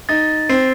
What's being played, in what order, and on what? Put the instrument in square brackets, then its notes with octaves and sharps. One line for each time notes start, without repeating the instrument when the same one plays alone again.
[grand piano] D#4 [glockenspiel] A6
[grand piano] C4 [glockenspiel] C7